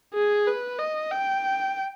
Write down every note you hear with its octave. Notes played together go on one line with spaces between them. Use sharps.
G#4
B4
D#5
G5